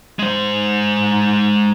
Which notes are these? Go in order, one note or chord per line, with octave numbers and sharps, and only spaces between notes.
G#3 C5